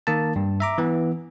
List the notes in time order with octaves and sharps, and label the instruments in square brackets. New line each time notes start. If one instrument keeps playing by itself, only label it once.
[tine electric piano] D#3 A#3 A5
G2
E5 A#5 D6
E3 B3